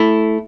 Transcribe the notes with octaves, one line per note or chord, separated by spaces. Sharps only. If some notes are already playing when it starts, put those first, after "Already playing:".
Already playing: A3 E4